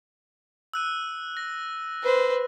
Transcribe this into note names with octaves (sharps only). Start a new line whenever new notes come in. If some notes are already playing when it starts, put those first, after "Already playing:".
E6 F#6 D#7
A#6
B4 C5